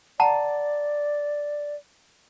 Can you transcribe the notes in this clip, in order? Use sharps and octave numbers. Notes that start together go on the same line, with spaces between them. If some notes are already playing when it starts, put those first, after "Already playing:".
D5 F#5 A5 A#5